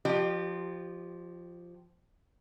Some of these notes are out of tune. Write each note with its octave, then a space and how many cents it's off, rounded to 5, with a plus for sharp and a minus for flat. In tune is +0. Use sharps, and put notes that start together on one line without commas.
F3 +0 G4 -20 D#5 -45